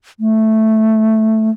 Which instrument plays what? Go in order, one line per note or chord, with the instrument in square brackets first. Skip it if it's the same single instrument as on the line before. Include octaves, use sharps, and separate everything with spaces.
[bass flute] A3